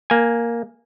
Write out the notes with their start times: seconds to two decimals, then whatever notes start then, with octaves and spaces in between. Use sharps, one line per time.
0.10 A#3 G#5